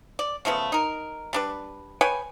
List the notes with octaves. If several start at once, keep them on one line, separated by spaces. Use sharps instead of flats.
D5
C#3 F3 A3 B3
D#4 A#4
G3 D4 B4
B4 C#5 G5 G#5